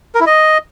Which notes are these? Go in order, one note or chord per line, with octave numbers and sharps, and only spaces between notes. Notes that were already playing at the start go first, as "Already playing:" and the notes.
A#4
E4
D#5